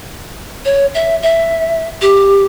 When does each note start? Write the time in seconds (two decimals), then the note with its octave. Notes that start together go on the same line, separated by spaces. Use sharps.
0.65 C#5
0.94 E5
1.22 E5
2.01 G4